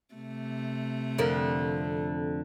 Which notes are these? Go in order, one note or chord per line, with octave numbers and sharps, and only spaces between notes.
C3 A3
F2 D3 A#4